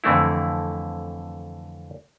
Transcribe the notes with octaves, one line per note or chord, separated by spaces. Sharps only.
F2 D3 E3 A3 C4 E4